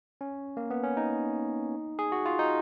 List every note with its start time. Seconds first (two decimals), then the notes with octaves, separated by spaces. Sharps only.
0.21 C#4
0.57 A#3
0.70 B3
0.84 C#4
0.97 D#4
1.99 G#4
2.12 F#4
2.26 F4
2.39 D#4